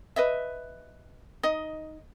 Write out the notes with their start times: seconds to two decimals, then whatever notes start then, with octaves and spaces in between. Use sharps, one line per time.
0.16 B4 D#5 E5
1.43 D#4 D#5